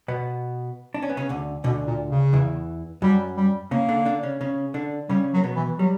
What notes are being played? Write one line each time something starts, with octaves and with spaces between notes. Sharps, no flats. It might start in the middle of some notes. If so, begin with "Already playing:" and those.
B2 B3
D4
C#4
B3
C#3 C#4
D2 D3
D2 B2 D3
A#2
C#3
E2 E3
F#2 F#3 G3
G3
C#3 A#3 C#4
D3 D4
D3 D4
C#3 C#4
C#3 C#4
D3 D4
C#3 G3 C#4
F#3
A#3
B2 B3
E3
F#3 G3